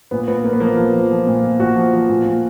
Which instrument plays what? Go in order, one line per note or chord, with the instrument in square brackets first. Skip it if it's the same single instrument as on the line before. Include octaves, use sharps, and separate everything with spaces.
[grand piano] A#2 B3
A#2 B3
A#2 A#3
B3
F3 A#3
F3
F3
F3
A#2
A#2
A#2 F#4
F3
F3
A#2
A#2